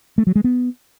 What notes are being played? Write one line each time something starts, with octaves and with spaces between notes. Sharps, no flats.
A3
F#3
G#3
B3